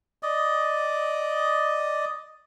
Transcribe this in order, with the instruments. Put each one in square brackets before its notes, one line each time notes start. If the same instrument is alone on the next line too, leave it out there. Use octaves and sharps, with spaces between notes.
[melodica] D5 D#5